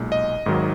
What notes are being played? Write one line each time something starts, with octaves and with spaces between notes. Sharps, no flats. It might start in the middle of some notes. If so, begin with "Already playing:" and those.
Already playing: B1 A#2 G#3
D#5
G#1 G#2 D#3 F#3